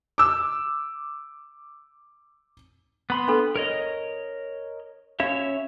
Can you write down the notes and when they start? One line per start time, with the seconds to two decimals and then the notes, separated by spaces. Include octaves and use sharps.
0.18 D6 E6
3.10 B3 B5 C6
3.28 D4 A4 B4
3.56 A#4 C#5 D#5
5.20 C#4 F#4 C#5 E5 F5